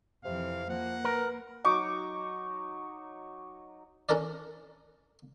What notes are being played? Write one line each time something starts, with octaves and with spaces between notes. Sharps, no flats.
F2 C3 E3 F5
F3 A#3 F#5
A#4 B4
F#3 D#4 C#6 D6
C#4 D4 A4 A#4 D5